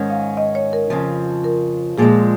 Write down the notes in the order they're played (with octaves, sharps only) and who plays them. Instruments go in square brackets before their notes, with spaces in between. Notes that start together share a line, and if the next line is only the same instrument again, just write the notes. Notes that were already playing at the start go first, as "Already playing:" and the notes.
Already playing: [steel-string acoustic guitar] G#2 D#3 C#4
[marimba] F5
D#5
C#5
A#4
[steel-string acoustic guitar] F2 C#3 F3
[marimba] A#4
[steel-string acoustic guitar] A#2 F3 G#3 [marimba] G#4